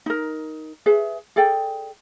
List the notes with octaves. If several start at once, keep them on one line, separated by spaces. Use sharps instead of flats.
D#4 A#4
G#4 B4 E5
G#4 A4 D5 G5